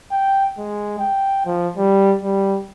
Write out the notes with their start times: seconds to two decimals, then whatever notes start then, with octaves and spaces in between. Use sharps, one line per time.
0.11 G5
0.58 G#3
0.99 G5
1.46 F3
1.77 G3
2.22 G3